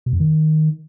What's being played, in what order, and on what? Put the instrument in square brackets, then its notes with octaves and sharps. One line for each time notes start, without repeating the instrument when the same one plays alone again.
[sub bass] B2
F#2
D#3